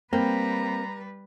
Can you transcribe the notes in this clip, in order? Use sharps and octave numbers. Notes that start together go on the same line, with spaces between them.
G3 A#3 C4 B4 A#5